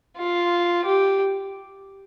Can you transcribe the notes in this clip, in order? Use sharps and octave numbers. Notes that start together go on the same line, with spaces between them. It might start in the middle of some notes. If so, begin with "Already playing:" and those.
F4
G4